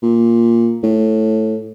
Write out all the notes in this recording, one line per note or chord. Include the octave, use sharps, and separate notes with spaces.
A#2
A2